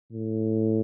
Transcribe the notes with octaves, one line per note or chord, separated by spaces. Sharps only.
A2